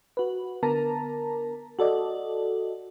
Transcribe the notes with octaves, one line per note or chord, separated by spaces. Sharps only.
F#4 B4
D3 B3 A#4 A5 A#5
F#4 A4 D5 D#5